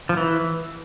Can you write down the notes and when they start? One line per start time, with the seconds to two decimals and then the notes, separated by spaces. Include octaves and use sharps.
0.09 F3
0.17 E3